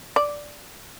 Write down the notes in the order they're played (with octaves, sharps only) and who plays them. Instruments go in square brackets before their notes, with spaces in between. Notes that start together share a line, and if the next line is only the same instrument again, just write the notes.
[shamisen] D5